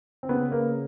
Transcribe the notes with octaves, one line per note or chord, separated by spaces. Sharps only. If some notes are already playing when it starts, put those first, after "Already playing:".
C4
C#3 B3
A#3